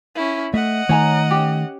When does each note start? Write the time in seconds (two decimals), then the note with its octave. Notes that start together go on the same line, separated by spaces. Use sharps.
0.16 C#4 E4
0.54 A3 D#5 E5 F#5
0.89 D#3 A3 C#5 G#5 A#5
1.31 C#4 G4